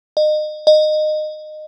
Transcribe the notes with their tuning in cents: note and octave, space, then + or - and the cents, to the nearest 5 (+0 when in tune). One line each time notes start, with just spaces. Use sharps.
D#5 -30
D#5 -20